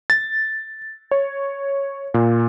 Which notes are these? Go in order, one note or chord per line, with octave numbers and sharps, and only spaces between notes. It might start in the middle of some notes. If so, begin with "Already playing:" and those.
A6
C#5
A#2